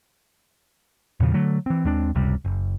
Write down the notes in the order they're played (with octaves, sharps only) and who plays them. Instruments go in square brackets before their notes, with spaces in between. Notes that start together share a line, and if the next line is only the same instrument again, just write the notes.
[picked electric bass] E2 A#2 C#3 F3
D3 F#3 A3
E3 C4
D#2 G#3 C4 D4
F#1 C#2 C3 G3
F#1